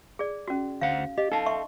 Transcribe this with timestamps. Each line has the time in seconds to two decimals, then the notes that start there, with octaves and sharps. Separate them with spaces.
0.19 G#4 D5
0.48 C#4 F#4
0.81 D2 C5 F5 F#5
1.18 G4 D#5
1.32 D#4 A4 F5 A5
1.46 E5 C6 C#6